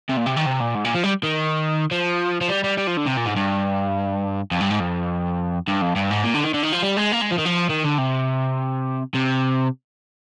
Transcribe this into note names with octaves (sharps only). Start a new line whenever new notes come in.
C3
A#2
C3
D#3
C3
A#2
G#2
A#2
F3
G3
D#3
F3
F3
G3
G3
G3
F3
D3
C3
A#2
G#2
G2
F2
G2
G#2
F2
G2
F2
G2
G#2
A#2
D3
D#3
D3
D#3
F3
G3
G#3
A#3
G#3
F3
D#3
F3
D#3
D3
C3
C3